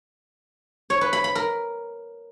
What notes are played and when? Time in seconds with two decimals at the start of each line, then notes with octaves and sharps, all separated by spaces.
0.90 C#5
1.01 B4
1.13 B5
1.24 B5
1.35 A#4